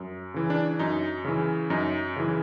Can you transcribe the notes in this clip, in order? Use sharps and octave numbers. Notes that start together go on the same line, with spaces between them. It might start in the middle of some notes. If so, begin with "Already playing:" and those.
Already playing: F#2
C#3 E3
D4
F#2 D#4
C#3 E3
F#2 D#4
C#3 E3